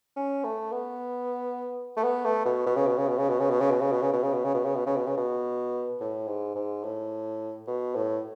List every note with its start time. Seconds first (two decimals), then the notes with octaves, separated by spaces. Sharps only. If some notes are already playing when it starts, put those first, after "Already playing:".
0.16 C#4
0.44 A3
0.72 B3
1.97 A3
2.04 B3
2.25 A3
2.46 B2
2.67 B2
2.77 C#3
2.87 B2
2.98 C#3
3.08 B2
3.18 C#3
3.29 B2
3.40 C#3
3.50 B2
3.61 C#3
3.71 B2
3.81 C#3
3.92 B2
4.02 C#3
4.13 B2
4.23 C#3
4.34 B2
4.45 C#3
4.54 B2
4.65 C#3
4.76 B2
4.86 C#3
4.97 B2
5.07 C#3
5.17 B2
6.00 A2
6.28 G#2
6.56 G#2
6.84 A2
7.67 B2
7.95 A2